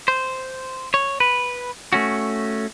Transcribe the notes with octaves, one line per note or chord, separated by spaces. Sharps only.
C5
C#5
B4
A3 C#4 F#4